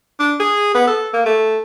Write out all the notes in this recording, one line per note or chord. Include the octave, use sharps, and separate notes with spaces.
D4
G#4
B3
A4
A#3
A3